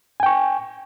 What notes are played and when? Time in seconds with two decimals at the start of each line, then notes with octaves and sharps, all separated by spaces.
0.20 G#5
0.23 G5
0.26 C#6